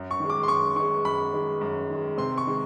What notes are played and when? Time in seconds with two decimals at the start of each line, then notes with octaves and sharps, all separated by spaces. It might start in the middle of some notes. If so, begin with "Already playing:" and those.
Already playing: F#2
0.11 C#6
0.20 D#3 G#3
0.30 D6
0.43 C6
0.48 F#2 C#6
0.76 D#3 G#3 C#6
1.05 F#2 B5
1.34 D#3 G#3
1.61 F#2
1.90 D#3 G#3
2.18 C3 C6
2.38 C#6
2.47 D#3 G#3